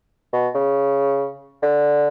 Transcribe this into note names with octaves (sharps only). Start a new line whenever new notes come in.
B2
C#3
D3